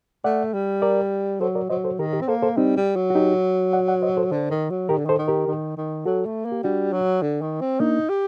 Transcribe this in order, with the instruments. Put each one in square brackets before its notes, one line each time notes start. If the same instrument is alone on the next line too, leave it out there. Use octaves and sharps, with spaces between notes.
[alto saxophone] A3 [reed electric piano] D5 F#5
[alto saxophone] G3
[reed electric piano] A#4 D5
[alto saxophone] F#3 [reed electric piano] A4 C5
[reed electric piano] A#4 D5
[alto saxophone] F#3 [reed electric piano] C5 D#5
[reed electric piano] A4 C5
[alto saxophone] D#3 [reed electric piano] G4 A#4
[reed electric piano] G4 A#4
[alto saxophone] C4
[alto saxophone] A#3 [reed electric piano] A4 C5
[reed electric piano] A4 C5
[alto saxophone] G3 [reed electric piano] C4 D#4
[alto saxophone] G3
F#3
[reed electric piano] F#4
D#4 G4
D5 F#5
D5 F#5
C5 D#5
A4 C5
[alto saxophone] D3 [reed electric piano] A4 C5
[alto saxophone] D#3
F#3
[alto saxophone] D#3 [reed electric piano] G4 A#4
[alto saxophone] D3
[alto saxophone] D#3 [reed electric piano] A4 C5
[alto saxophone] D#3
[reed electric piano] G4 A#4
[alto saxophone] D#3
D#3
[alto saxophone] F#3 [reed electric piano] F#4 A4
[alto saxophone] A3
A#3
[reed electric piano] G4
[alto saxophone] G3 [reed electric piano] D4 F#4
[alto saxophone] F#3
D3
D#3
C4
[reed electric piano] A#3 D4 [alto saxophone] D#4
[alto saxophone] G4